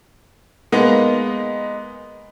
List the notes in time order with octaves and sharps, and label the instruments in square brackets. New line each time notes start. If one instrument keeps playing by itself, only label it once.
[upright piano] G#3 A#3 B3 D#4